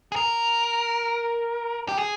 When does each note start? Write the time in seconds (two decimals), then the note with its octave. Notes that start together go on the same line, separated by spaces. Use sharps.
0.12 G#4
0.16 A#4
1.88 G4
1.98 G#4